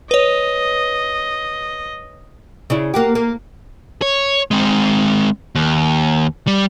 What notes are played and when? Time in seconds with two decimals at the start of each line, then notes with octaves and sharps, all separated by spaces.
0.11 B4 C#5 D#5
2.70 C#3 D4 E4
2.94 A#3 F#4 G4
3.15 A#3
4.02 C#5
4.51 G#3 C4
5.55 D#2
6.47 G3